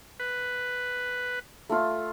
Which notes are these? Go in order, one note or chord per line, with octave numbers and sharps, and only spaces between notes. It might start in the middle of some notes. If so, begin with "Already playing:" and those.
B4
A3 F4